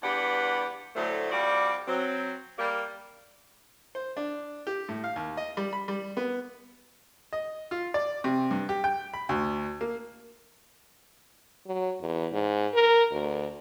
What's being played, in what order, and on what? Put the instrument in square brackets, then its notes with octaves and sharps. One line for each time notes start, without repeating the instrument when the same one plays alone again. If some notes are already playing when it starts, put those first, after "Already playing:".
[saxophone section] E2 G2 G4 B4 D5 F#5
D2 A2 D3 F#3 A3 C5
F2 G3 F4 F#4 D5
F#3 C4
G3 A#3
[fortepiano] C5
D4
G4
A2
F5
D#2
D#5
G3
B5
G3
B3
D#5
F4
D5
C3
G2
G4
G5
B5
D2
A#3
[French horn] F#3
E2
G#2
A#4
D2